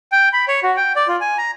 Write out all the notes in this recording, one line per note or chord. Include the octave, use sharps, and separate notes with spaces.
G5
B5
C#5
F#4
G5
D5
F4
G#5
A#5